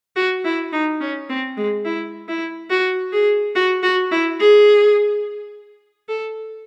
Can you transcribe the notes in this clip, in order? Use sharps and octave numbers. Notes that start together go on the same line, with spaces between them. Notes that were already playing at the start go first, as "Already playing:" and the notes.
F#4
E4
D#4
C#4
C4
G#3
E4
E4
F#4
G#4
F#4
F#4
E4
G#4
A4